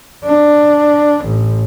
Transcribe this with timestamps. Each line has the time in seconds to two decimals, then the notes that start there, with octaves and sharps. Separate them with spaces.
0.24 D4
1.24 A1